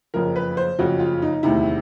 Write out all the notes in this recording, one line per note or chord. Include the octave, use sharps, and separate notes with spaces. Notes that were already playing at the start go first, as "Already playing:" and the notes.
F#1 F2 C#3 F3 A#4
B4
C5
F#1 F2 C#3 F3 F#4
F4
D#4
E1 D2 C3 D#3 E4